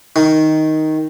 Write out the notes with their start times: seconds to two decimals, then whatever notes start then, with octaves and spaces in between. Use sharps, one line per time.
0.16 D#3